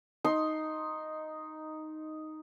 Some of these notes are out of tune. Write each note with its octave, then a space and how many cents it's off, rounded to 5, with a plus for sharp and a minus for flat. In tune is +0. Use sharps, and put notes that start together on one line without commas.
D#4 +0 C6 +10